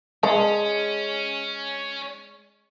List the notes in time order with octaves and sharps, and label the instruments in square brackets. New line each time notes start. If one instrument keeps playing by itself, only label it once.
[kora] G#3 [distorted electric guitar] C#4 [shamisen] D5 A5